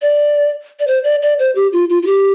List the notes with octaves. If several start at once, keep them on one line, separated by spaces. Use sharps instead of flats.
D5
D5
C5
D5
D5
C5
G4
F4
F4
F4
G4